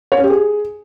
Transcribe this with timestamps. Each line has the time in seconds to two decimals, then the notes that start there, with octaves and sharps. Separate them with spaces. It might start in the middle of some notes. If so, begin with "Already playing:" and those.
0.12 C#5
0.18 C#4
0.24 G4
0.30 G#4